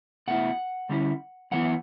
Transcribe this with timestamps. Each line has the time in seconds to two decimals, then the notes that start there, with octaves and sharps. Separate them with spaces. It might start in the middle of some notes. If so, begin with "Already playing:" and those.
0.28 B2 A3 E4 F#5
0.89 D3 G3 C#4 E4
1.51 F#2 E3 B3 E4 F#5